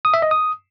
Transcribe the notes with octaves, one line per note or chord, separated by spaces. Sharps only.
D#6
E5
D#5
D#6